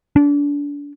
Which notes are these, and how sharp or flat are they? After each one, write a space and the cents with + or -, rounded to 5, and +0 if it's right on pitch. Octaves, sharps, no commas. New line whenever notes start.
D4 -30